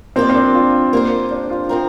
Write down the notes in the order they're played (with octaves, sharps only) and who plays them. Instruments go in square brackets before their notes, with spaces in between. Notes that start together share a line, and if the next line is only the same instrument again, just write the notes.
[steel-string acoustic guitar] F3 A#3 G4 D5 [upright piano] C4
[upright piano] C4
D4
F4
[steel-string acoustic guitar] A#3 G4 C5
[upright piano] D4
F4
[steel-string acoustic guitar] C3 F3 C4 A#4